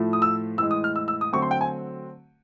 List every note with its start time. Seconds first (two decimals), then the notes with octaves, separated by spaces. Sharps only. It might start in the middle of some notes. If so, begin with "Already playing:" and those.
Already playing: A2 F3 A3
0.13 D#6
0.22 E6
0.58 A2 E3 G#3 E6
0.71 D#6
0.84 F6
0.96 E6
1.08 E6
1.21 D#6
1.33 D3 F#3 A3 C4 C#6
1.42 C6
1.51 G5
1.61 G#5